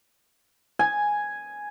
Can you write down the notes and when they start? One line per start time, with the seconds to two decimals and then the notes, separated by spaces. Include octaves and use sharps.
0.79 G#5